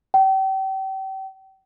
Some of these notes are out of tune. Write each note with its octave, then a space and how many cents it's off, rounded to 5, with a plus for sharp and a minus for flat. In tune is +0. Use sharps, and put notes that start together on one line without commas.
G5 -35